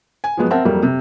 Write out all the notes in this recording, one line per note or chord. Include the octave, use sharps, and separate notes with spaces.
G#5
F3 F#3 G#3 B3
C4 A#4 E5 F#5 A5
F2 F#3 G3 A#3
C3